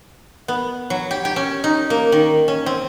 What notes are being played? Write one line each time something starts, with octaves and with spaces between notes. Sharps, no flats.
B3
F#3
G4
G4
C#4
D#4
A#3
D#3
C#4
C4